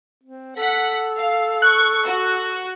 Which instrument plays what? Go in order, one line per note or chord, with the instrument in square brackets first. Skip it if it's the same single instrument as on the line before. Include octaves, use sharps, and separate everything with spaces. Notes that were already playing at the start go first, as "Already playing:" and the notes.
[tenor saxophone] C4
[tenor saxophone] A4 [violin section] F#5 B6
[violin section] F5
[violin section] C#6 [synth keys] F#6
[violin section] F#4